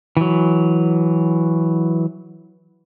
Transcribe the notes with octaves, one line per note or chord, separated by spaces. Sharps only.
E3 F#3